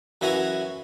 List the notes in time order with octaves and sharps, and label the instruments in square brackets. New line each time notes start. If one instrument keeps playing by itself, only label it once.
[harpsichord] F#2 E3 E4 F#4 G#5 A#5